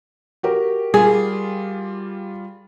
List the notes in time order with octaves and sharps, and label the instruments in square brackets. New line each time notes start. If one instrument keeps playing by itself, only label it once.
[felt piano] F#4 G4 A#4
[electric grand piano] G3 F4 [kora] G#4